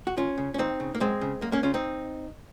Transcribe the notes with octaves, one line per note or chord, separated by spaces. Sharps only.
F#4
D#2 C#4 F4
C#3
C#4
D#2 C4 D#4
C#3
A#3
F#2 G#3 C4
C#3
F#2 A#3
A#3 C#4
C#3 C#4 F4
C4 D#4